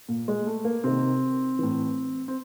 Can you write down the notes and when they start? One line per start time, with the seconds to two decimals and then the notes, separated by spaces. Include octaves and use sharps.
0.09 A#2
0.28 G#3
0.47 A3
0.65 A#3
0.84 C3 D#3 C4
1.59 A2 E3
2.28 C4